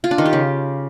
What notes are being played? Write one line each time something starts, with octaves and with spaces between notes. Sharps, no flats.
F4
D4
D#3
G4
C#3